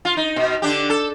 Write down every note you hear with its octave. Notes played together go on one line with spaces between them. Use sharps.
F4
D#4
B2
D3 D4 G4
A4